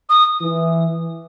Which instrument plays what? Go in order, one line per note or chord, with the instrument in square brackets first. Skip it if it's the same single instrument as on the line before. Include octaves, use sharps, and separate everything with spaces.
[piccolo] D#6
[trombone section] E3